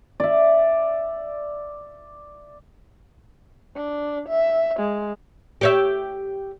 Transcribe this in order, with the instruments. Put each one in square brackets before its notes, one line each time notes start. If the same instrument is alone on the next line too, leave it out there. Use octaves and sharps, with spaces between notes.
[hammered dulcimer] D5 E5
[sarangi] D4
E5
G#3
[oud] G4 C#5 E5